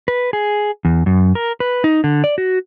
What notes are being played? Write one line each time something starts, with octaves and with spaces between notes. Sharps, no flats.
B4
G#4
E2
F#2
A#4
B4
D#4
D3
D5
F#4